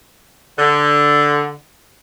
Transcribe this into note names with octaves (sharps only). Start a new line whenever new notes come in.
D3